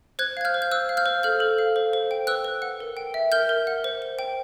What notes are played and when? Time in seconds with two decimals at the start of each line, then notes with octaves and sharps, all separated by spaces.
0.19 C5 F#6 G#6
0.37 F5 G#6
0.45 F6 G6
0.54 C5
0.62 G6
0.71 C5 E6 F#6
0.89 F5
0.97 F6 G6
1.06 C5
1.23 A4 F6 G6
1.40 A4
1.58 F5
1.76 C5
1.93 C5
2.11 G5
2.27 B4 E6 F#6
2.44 B4
2.62 F#5
2.80 A#4
2.97 G5
3.14 E5
3.32 A#4 F6 G6
3.49 A#4
3.67 F#5
3.84 C5
4.02 C5
4.19 G5